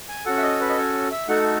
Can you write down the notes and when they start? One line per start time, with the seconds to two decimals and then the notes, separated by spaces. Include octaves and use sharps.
0.09 G#5
0.25 C#4 F#4 A4 F#5
0.37 E5
0.43 D#5
0.61 B4
0.70 D#5
0.78 C#5
1.11 E5
1.28 A3 D#4 F#4 A4 F#5